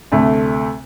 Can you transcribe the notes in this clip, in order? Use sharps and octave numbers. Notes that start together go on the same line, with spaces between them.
D2 C3 A3